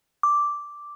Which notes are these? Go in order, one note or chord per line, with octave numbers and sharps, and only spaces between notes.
D6